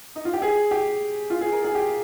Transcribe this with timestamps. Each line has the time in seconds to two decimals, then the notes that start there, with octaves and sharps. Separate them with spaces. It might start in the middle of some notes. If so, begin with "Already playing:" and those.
0.16 D#4
0.25 F4
0.33 G4
0.42 G#4
0.71 G4
1.30 F4
1.41 G#4
1.52 A#4
1.64 G#4
1.75 G4